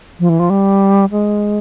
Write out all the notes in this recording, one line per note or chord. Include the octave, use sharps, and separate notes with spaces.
F3
E3
F3
G3
G#3